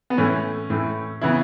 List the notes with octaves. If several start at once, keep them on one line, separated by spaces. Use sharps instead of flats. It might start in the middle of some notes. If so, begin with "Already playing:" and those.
B3
A2 E3 A3 C#4
A2 E3 A3
C#3 E3 B3 E4